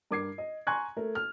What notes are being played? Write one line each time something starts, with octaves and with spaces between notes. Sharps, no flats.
G2 A#4 D6 G#6 C7
D#5
G#5 A#5 C6 C#6 F#6 G#6
A3 A#4
F6